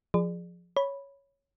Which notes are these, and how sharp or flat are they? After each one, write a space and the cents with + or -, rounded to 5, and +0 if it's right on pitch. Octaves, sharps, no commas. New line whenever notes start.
F3 +10 G#4 +0 D5 +25
C#5 +0 B5 -5